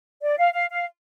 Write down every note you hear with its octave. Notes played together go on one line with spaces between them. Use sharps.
D5
F5
F5
F5